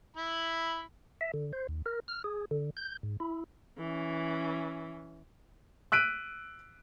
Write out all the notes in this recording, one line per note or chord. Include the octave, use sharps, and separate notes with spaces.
E4 B5
E5
D3
C5
D#2
A#4
F6
G#4
D3
G6
G#2
E4
E3 C#4
E6 F#6 B6 D7 D#7